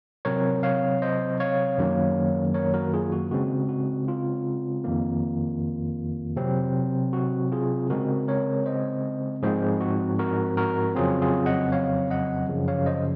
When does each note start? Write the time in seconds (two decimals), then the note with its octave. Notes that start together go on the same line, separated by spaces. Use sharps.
0.25 C3 F#3 C4 A#4 C#5
0.63 C#5 F5
1.02 C5 D#5
1.40 C#5 F5
1.78 F#2 D#3 F#3 A#3
2.54 A#4 C#5
2.74 F#4 A#4
2.94 F4 G#4
3.12 F#4
3.31 C#3 G#3 C4 F#4
3.69 F#4
4.08 F4
4.84 F2 D#3 A#3
6.36 C3 F#3 C4
7.13 F#4
7.52 F4 G#4
7.90 C#3 G#3 C4 F#4 A#4
8.28 A#4 C#5
8.66 C5 D#5
9.43 G#2 F3 G#3 C4 G#4 C5
9.81 F#4
10.19 F#4 A#4
10.57 F#4 A#4
10.95 F2 C#3 F#3 C4 F4 G#4
11.22 F4 G#4
11.46 D#5 F#5
11.72 C#5 F5
12.10 D#5 F#5
12.48 F#2 C#3 F3
12.68 C#5 F5
12.86 C5 D#5